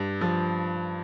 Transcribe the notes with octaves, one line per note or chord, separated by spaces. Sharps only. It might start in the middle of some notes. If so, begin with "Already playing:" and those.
Already playing: G2
F3